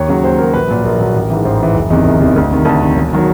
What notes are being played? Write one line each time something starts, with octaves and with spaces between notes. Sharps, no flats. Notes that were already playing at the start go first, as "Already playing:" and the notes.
Already playing: D#2 C#5
C#3 F#3
D#2 C5
C#3 F#3 A#4
A#1 B4
A#2 F#3
A#1 A#4
A#2 F#3
A1
G#2 E3
A1 C5
G#2 E3
F#1
E2 C3 D#3 D#5
F#1
E2 C3 D#3
D2
C3 D#3
D2 A5
C3 D#3
E1
D#3 F#3